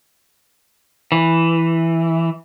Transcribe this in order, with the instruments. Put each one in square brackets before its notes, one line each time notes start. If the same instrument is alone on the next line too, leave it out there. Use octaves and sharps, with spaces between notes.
[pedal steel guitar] E3